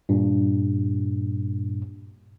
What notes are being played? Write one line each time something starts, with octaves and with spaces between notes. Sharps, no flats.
G2 A#2